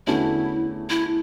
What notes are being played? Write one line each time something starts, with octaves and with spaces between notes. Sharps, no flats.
E2 D3 A3 C#4 E4 F#4
E4